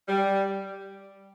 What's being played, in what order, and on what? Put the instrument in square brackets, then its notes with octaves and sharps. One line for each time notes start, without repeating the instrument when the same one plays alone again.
[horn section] G3